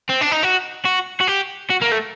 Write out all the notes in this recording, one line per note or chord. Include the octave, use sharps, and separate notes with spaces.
C4
D4
D#4
F#4
F#4
F#4
G4
F#4
A#3
A3